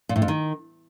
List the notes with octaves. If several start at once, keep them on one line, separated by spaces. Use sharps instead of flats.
A#2
A2
F2
D#3